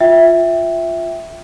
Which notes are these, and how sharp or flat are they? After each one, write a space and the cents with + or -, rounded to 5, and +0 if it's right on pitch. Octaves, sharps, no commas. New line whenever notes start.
F4 +0 E5 +0 G5 +0